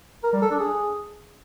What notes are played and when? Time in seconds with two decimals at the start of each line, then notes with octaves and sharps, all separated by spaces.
0.24 A#4
0.33 G3
0.42 A4
0.51 D4
0.60 G#4